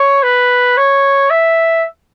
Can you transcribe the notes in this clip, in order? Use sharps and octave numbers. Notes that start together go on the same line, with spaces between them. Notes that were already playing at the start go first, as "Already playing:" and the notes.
Already playing: C#5
B4
C#5
E5